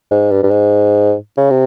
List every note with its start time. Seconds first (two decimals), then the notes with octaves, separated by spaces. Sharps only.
0.11 G#2
0.31 G2
0.43 G2
0.50 G#2
1.37 C#3
1.50 C3